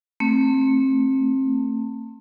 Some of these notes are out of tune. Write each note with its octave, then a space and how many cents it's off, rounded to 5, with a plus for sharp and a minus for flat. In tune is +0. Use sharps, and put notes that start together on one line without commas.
A3 +35 C4 +30